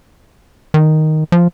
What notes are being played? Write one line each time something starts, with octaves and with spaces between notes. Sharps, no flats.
D#3
F3